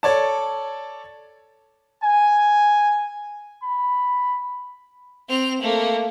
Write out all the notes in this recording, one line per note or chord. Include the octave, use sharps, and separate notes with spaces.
A4 C#5 D5 A5
G#5
B5
C4 F7
A3 A#3